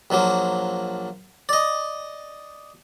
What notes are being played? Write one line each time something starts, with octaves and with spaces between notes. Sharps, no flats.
A#1 F3 F#3 A#3
D5 D#5